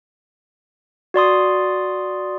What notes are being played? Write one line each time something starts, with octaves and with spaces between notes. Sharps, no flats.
F#4 D5 C6 D#6